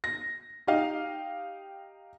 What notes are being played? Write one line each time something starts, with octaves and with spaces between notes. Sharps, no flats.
A#6
D#4 G4 D#5 F5